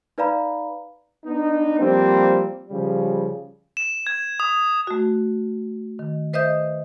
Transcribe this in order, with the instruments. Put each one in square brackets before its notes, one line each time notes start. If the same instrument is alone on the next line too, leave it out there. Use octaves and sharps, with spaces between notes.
[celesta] D#4 B4 D5 F5 A#5 B5
[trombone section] B3 D4 D#4
F3 G3 A#3 C4
C#3 F3 G3
[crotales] E7
G#6
D#6
[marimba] A3 F#4
D#3
B4 C5 D#5 E5 D#6 G6